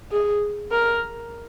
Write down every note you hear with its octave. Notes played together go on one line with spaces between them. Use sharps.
G#4
A#4